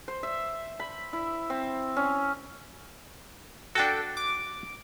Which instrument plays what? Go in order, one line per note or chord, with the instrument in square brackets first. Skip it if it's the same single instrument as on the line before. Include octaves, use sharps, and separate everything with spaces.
[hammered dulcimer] C5
E5
B5
E4
C4
C#4
[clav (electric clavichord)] D4 F#4 [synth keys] A4 G5
[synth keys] D6